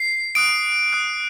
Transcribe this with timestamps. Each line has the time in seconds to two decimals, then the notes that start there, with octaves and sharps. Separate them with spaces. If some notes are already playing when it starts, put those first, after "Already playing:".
Already playing: C7
0.35 D#6 F#6 D7
0.93 D#6 F#6